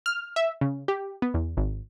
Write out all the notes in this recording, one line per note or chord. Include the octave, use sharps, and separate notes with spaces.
F6
E5
C#3
G4
B3
E2
G#1